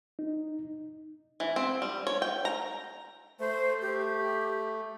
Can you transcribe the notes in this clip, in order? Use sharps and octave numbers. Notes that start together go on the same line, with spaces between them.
D#4
E3
C4
G3
C#5
G5
A#5
A3 C5
G4